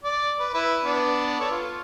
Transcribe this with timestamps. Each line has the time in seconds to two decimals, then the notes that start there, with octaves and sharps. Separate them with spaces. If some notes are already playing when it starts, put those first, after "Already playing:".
0.04 D5
0.40 B4
0.54 E4 B4
0.85 B3 D4
1.40 A4 C#5
1.52 F4